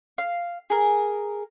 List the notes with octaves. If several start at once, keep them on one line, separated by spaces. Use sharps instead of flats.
F5
G#4 A#4